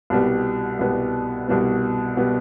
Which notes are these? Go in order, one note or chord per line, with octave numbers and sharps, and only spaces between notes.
C2 B2 G3 B3
C2 B2 G3 B3
C2 B2 G3 B3
B2 G3 B3